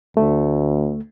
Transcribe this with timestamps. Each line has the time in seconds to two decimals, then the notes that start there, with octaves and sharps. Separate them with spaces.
0.17 D2 A3